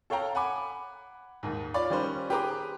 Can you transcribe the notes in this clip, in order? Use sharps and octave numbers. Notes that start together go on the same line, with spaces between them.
A4 C#5 F5 G5 A#5
F#5 G#5 B5 D6
D#2 G#2
F4 C#5 D5 B5
D#3 G3 C#4 B4 C5
G4 G#4 B4 A#5 C6 D6